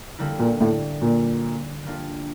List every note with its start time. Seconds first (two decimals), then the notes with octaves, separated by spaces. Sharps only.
0.18 D3 G3 A#3 E4
0.39 A#2
0.60 A2
1.02 A#2
1.85 G3 A#3 D4 F4